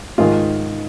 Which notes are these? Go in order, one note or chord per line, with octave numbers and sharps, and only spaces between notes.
G#2 D#3 G#3 F4